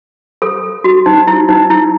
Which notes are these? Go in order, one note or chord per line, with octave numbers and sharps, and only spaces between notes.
A4
F#4
D#4
E4
D#4
E4